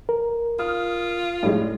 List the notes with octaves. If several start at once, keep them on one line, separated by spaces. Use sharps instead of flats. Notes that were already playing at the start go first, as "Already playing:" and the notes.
A#4
F4 D#6 F6
A2 G3 G#3